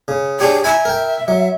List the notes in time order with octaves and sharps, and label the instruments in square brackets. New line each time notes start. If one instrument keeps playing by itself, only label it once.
[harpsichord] C#3
[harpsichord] D4 G4 C#5 [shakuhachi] G#4
[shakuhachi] E5 [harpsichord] G#5 A#5
[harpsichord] A#4 G5
F#3